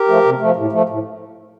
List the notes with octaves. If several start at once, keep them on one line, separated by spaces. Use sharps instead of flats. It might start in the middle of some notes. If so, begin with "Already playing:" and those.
Already playing: G4 A#4
F3 A3
C3
F3 A3
A2
F3 A3
A2